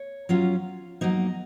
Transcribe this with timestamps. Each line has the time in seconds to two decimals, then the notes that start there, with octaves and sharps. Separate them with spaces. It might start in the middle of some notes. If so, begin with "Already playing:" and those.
Already playing: C#5
0.29 F#3 C#4 F4
1.01 F#3 A#3 D#4 D#5